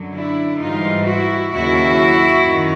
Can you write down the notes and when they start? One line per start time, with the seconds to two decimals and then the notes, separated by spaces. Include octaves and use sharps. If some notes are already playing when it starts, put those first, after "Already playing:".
Already playing: F#2 D3 F#3
0.13 D4 E4
0.59 G#2 E3 G3 D#4 F4
1.06 E4 F#4
1.51 D#2 C#3 F#3 E4 F#4
2.44 F#2 D#3